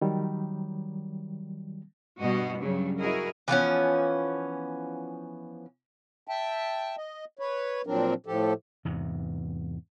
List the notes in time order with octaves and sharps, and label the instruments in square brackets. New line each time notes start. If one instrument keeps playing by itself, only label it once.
[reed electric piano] D#3 F#3 G3
[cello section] G2 B2 F#4 D#5
G2 C#3 F#3 G3
E4 F#4 G#4 A#4 D#5
[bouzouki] E3 F3 B3 C#4
[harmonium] E5 G5 A5
D#5
B4 C#5
A#2 F3 F#3 C4 D4 A#4
A2 F3 G4 A4
[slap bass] E2 G#2 C3